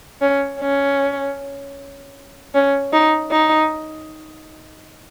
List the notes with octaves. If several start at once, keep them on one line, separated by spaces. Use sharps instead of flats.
C#4
C#4
C#4
D#4
D#4